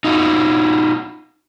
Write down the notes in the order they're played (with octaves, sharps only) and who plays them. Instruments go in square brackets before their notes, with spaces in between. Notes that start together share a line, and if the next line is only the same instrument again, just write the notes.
[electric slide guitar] D#4 F4 F#4